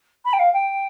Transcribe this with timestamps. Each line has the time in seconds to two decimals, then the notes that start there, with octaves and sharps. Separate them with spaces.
0.25 B5
0.33 G5
0.39 F5
0.53 G5